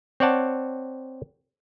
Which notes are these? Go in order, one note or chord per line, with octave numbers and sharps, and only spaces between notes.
C4 C#5 D5 F#5 A5